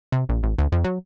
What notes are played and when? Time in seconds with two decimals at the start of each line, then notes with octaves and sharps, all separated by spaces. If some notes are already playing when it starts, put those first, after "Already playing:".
0.12 C3
0.29 A#1
0.43 A1
0.58 D2
0.72 F2
0.84 F#3